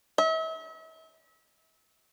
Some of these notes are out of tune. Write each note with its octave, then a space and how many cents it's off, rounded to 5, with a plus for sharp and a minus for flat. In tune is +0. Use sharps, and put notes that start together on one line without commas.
E5 -40